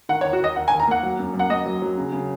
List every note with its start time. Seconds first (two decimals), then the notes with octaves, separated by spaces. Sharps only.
0.09 D#3 F#5
0.21 C#5
0.24 D#2
0.33 F#4
0.40 D#2 D#5
0.56 D#2 F#5
0.68 G#5
0.72 D#2
0.80 A#5
0.88 A#3 F#5
1.03 F#3
1.19 F#2
1.34 F#2
1.39 F#5
1.49 A#3 D#5
1.66 F#3
1.82 F#3
1.98 C#3
2.13 C#3